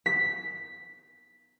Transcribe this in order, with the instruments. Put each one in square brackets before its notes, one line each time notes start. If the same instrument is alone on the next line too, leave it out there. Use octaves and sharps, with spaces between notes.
[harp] B6